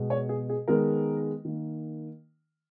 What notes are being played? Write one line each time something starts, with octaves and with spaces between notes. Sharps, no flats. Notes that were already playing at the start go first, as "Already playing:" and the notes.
Already playing: B2 G#3 B3
C#5
G#4
G#4
D#3 G#3 B3 A#4
D#3 A#3